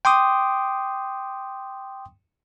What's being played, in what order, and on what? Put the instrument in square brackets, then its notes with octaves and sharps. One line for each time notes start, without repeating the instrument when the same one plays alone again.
[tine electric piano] G5 C6 D6 D#6